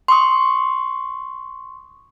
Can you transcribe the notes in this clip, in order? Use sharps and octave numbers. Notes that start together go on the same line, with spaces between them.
C6 C#6 D#6